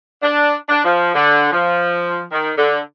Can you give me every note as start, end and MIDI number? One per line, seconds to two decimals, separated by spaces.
0.23 0.53 62
0.69 0.82 62
0.85 1.10 53
1.14 1.46 50
1.52 2.22 53
2.32 2.51 51
2.57 2.79 50